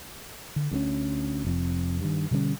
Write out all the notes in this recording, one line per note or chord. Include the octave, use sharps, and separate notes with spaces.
D3
D2 A3 C#4
F1 F2 C4
G2 D#3
B2 D3 G3 C#4